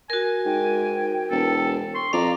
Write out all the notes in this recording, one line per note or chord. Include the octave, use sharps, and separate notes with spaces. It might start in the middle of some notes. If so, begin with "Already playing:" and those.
F#4 A#4 G#5
G#2 G5
E1 A4
C6 C#6
F2 D5 F5 A#5